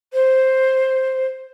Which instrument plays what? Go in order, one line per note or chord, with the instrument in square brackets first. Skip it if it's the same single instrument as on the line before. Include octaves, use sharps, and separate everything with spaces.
[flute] C5